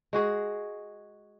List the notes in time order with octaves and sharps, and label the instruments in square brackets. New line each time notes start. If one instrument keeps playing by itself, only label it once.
[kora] G#3 F#4 G#4